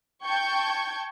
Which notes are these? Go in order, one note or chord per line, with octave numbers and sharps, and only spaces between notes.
G5 A5 C#6 G6 G#6